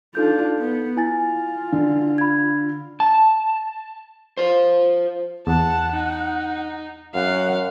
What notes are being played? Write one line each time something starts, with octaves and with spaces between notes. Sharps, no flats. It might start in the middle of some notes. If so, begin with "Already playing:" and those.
D4 D#4 F4 A4 G6
B3
E4 F4 G#5 A6
D3
B5 G#6
A5
F4 C5
E2 F#5 A5
D#4
F#2 F5 F#5